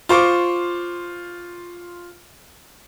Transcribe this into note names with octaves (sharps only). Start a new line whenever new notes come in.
F4 C5 C#6 D6